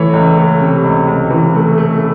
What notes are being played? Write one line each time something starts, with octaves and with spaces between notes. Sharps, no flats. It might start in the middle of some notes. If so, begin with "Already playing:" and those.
Already playing: E3 A3 C#5
C#2
A3
C3
C#2
C#2
E3
A3
A3